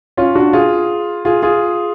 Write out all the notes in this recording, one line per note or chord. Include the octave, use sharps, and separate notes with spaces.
C#4 F4
D4 F#4
F4 G#4
F4 G#4
F4 G#4